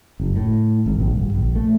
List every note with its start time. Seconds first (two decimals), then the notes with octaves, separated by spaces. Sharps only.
0.20 F#1
0.36 A2
0.86 G#1
1.00 A#1
1.16 G1
1.35 A#1
1.55 A3